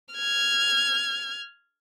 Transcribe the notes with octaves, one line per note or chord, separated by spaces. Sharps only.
F6 G#6